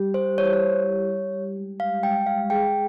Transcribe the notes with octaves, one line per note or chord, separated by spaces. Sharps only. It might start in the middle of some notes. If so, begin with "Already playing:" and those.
Already playing: G3 G4
G4 C5
E4 C#5
C5
C#5
G3
G3
G4
G4
G#3
G#3 F5
G#3 G5
G#3 F5
G#4 G5